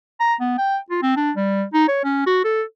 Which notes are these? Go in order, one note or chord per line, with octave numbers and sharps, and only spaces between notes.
A#5
B3
G5
F4
C4
D4
G3
D#4
C#5
C#4
F#4
A4